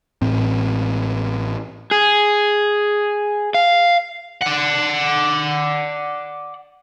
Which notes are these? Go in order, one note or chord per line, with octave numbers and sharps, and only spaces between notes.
A1 A2 C4
G#4
F5
D5 F#5